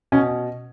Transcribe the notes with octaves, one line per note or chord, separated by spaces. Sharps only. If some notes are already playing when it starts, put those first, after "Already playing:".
B2 C#4